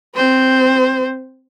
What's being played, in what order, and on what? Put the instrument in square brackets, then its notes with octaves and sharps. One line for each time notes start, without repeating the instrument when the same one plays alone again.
[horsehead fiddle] C4 C5